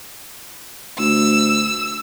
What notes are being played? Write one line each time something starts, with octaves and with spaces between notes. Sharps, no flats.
D2 E6